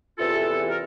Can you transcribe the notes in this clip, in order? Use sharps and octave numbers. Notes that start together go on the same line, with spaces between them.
E2 C3 E3 F4 A4
E2 C3 E3
A#4